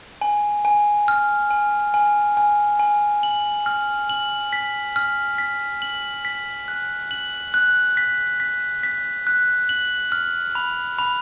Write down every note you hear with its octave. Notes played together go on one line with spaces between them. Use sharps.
G#5
G#5
F6
G#5
G#5
G#5
G#5
F#7
F6
F#7
B6
F6
B6
F#7
B6
F#6
F#7
F#6
B6
B6
B6
F#6
F#7
F6
B5
B5